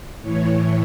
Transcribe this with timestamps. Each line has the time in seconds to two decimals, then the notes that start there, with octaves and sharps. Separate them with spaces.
0.22 A2 E3 C#5